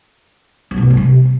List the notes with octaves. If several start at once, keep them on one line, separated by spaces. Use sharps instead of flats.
F#3
B2
F#3
G3
C3